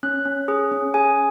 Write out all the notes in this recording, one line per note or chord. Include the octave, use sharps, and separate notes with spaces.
C#4 F#6
C#4
G#4
C#4
G#4 G#5